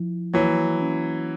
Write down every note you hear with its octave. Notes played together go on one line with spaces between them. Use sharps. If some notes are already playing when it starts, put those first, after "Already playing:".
Already playing: F3 E4
E3 F#3 A#3
C#4